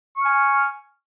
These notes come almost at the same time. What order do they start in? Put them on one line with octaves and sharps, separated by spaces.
C#6 F6 G#5